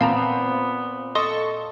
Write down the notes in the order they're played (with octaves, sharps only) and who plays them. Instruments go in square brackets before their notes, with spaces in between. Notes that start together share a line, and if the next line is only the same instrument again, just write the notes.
[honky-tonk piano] A#2 [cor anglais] B3 [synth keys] C4 [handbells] F5 A5 A#5
[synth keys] A4 C#6 [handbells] D#5 C6 D#6